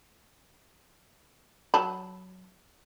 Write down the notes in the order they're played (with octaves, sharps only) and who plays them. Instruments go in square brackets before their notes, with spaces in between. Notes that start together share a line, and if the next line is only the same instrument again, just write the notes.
[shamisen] F#3 A5 B5